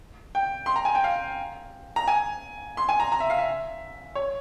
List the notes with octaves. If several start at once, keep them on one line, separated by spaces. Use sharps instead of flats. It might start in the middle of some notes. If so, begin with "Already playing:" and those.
G5
C6
A#5
G#5
G5
F5
A#5
G#5
C6
G#5
A#5
A#5
E5
F5
E5
C#5